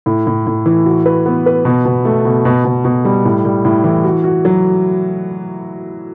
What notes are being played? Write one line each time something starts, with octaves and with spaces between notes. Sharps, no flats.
A2
A2
A2
E3
F#4
B4
B3
B4
B2
B2
A3
B2
B2
B2
B2
G3
A2
G3
A2
E3
F#4
F#4
F#3